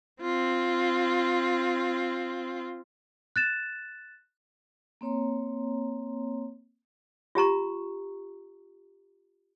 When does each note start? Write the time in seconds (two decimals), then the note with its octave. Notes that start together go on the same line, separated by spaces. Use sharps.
0.21 C4 F4
3.36 F#6 A6 E7
5.01 A#3 C4 C#5 A#5 C6
7.35 F4 G4 A#5 C#6